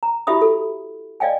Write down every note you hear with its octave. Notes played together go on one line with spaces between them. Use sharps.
A#5
E4 F#4 G4 E5 B5 D#6
A4
D5 D#5 F5 G5 G#5